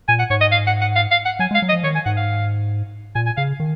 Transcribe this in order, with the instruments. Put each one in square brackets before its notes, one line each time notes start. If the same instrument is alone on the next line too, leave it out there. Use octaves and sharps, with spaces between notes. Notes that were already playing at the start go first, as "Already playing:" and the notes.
[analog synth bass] A#2 [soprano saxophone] G#5
[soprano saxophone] F#5
[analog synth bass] G#2 [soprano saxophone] C#5
[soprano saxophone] D#5
F5
F#5
F#5
F5
F5
F#5
[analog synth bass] F#3 [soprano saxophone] G#5
[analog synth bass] G#3
[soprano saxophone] F5
[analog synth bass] F#3
[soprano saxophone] D#5
[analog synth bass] F3
[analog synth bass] D#3 [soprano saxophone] C#5
[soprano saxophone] G#5
[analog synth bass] G#2 [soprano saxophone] F#5
[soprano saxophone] F5
[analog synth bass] A#2 [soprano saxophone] G#5
[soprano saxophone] G#5
[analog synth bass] C#3 [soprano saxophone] F5
[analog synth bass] D#3